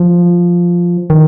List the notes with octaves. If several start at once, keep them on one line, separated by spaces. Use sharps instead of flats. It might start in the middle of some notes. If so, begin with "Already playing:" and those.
Already playing: F3
D#3